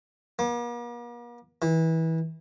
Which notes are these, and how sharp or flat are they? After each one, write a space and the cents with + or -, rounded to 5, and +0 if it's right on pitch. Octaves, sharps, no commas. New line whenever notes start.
A#3 +45
E3 -25